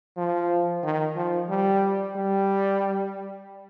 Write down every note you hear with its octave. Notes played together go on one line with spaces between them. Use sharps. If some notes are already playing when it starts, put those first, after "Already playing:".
F3
D#3
F3
G3
G3